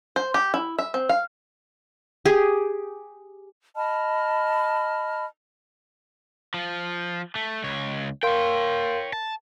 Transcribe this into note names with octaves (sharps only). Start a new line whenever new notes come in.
C5
G4
E4
E5
C4
F5
G4 G#4
D#5 A5 B5 F6
F3
A3
C#2 C#5
A#4 C#5 F5 G5 C6
A5